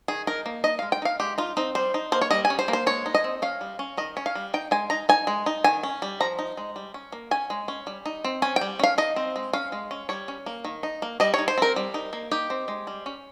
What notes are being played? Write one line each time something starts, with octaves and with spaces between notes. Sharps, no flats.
D#3 G#4
D#4 A#4
A#3
D#4 D#5
G#3 F5
G5
D#4 F5
G#3 G4
D#4 F4
C4 D#4
G3 C5
D#4
A#3 C5
C#5
G3 D#5
G#5
C#4
C5
A#3
C5
G#3 C#5
D#4
D#5
C4
C#4 F5
G3
C#4
D#3 D#5
C#4
F5
G3
D#4 G5
G#3 G#5
D#4 A#5
D#4 G#5
G#3
D#4
D#3 G#5
C#4
G3
F3 A#5
D#4
G#3
G3
C#4
A#3
C#4 G#5
G#3
C#4
G3
D#4
C4
C#4 G#5
G5
G3
C#4 F5
D#4 D#5
C4
G#3
C#4 F5
G#3
C#4
G3 C#5
C#4
A#3
D#3
D#4
A#3
G3 D#5
C#5
D#4
C5
C4 A#4
G3
D#4
A#3
D#4 G4
C4
G#3
G3
C#4